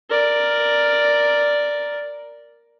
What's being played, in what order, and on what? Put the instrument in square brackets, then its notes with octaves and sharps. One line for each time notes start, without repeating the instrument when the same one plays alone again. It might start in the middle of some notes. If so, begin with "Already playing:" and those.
[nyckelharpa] A#4 D5